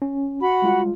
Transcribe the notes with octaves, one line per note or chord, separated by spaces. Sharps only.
C#4
F#4 F#5 B5
G3 G#3 F4